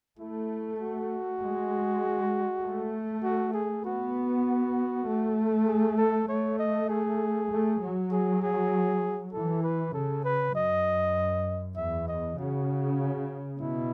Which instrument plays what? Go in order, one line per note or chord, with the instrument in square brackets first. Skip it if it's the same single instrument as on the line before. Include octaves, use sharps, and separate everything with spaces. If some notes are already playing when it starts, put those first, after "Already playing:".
[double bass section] A3 [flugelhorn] E4
[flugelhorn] F#4
[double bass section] G#3
A3
[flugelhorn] F#4
G#4
[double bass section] B3 [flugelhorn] F#4
[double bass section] A3
[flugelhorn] G#4
A4
[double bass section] A3 [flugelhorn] C#5
[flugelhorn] D#5
G#4
[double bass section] A3
F#3
[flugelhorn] G#4
G#4
[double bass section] E3 [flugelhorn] A4
[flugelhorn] B4
[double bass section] C#3 [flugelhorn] A4
[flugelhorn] B4
[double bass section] F#2 [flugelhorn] D#5
[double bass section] E2 [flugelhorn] E5
[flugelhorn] D#5
[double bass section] C#3 [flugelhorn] F#4
[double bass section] B2 [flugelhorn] E4